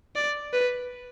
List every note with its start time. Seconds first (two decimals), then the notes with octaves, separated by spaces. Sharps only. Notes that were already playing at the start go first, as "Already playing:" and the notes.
0.16 D5
0.53 B4